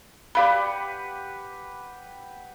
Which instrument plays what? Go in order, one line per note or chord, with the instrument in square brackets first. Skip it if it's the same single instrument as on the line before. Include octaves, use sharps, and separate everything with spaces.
[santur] G4 B4 F#5 [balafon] D5 F5 B5